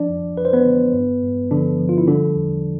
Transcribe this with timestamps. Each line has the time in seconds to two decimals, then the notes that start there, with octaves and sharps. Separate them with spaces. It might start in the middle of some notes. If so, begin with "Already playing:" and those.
Already playing: F3 D4 D5
0.09 F2
0.37 F2 B4
0.45 C5
0.53 B3 B4
0.66 D3
0.94 G2
1.23 G2
1.51 D3 F3 D4
1.79 F3
1.89 F4
1.98 E4
2.07 D3 G3 D4
2.36 E2